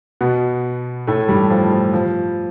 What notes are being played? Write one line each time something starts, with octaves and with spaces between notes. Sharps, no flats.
B2 B3
A2 A3
G2 G3
F3
F3
F3